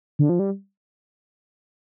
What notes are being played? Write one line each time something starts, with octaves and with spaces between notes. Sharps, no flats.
D3
F3
G3